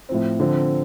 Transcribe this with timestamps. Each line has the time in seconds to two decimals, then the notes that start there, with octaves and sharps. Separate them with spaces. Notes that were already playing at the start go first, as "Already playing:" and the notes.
0.09 A2 F3 C4
0.40 D3 F3 C4